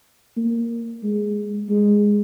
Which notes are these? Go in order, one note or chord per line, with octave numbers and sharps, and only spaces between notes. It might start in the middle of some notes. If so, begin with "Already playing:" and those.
A#3
G#3
G#3